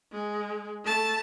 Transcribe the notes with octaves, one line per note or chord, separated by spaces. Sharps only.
G#3
A3 A5